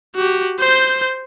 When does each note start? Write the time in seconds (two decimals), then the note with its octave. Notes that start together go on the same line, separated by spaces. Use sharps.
0.15 F#4 G4
0.59 C5 G6